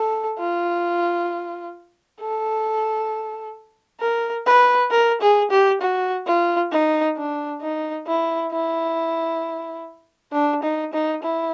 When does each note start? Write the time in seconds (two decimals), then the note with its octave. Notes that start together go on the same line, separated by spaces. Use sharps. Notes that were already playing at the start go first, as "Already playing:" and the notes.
Already playing: A4
0.39 F4
2.20 A4
4.00 A#4
4.46 B4
4.91 A#4
5.21 G#4
5.50 G4
5.81 F#4
6.26 F4
6.72 D#4
7.17 D4
7.61 D#4
8.07 E4
8.52 E4
10.32 D4
10.63 D#4
10.93 D#4
11.23 E4